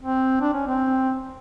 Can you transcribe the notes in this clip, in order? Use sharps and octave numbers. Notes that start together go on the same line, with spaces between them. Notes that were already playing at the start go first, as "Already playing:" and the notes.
C4
D4
C#4
C4